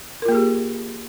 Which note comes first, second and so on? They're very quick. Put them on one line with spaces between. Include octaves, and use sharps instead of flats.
A#4 F4 A#3 G#4 G4